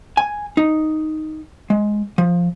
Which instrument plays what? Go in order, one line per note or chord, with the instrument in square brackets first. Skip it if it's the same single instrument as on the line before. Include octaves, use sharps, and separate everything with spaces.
[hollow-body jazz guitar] G#5
D#4
G#3
F3